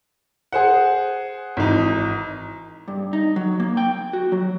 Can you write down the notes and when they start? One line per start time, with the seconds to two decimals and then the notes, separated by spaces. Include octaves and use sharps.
0.52 G#4 C5 F#5
1.57 G#1 E3 D#4
2.88 G2
3.13 D#4
3.36 F#3
3.60 A#3
3.77 G5
4.13 F#4
4.32 F#3